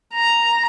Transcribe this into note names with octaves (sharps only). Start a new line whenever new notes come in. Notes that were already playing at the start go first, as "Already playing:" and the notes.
A#5